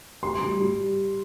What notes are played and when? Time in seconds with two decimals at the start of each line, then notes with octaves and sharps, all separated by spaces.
0.22 G3 C6
0.41 G3
0.59 G3